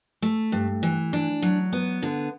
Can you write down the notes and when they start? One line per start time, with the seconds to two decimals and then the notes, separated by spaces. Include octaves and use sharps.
0.22 A3
0.52 G2
0.83 E3
1.13 D4
1.42 F#3
1.73 B3
2.02 D3